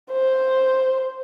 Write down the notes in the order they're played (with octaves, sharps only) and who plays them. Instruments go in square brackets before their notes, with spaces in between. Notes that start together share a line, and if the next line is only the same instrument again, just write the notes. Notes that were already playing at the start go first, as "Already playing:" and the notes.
[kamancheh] C5